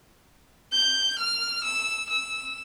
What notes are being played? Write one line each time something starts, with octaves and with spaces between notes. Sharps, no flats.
G6
F6
E6
E6